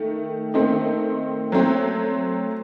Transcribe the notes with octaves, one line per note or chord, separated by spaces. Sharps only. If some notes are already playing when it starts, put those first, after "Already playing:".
Already playing: D#3 A3
D#3 A3 C4 D#4
F#3 A3 C4